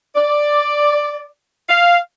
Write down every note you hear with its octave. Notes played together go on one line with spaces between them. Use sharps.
D5
F5